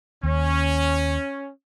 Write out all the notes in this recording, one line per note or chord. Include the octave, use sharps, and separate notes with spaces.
D#2 C#4